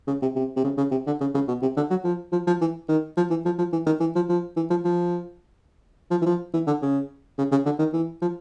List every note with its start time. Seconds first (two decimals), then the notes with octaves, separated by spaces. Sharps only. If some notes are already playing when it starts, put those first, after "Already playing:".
0.07 C#3
0.22 C3
0.35 C3
0.56 C3
0.64 C#3
0.77 C#3
0.91 C3
1.07 D3
1.21 C#3
1.34 C#3
1.48 B2
1.62 C3
1.77 D3
1.90 F#3
2.04 F3
2.32 F3
2.47 F3
2.61 E3
2.88 D#3
3.17 F3
3.30 E3
3.45 F3
3.58 F3
3.72 E3
3.86 D#3
4.00 E3
4.15 F3
4.29 F3
4.57 E3
4.70 F3
4.84 F3
6.11 F3
6.21 E3
6.26 F3
6.54 E3
6.67 D3
6.82 C#3
7.38 C#3
7.52 C#3
7.65 D3
7.79 D#3
7.93 E3
8.22 F3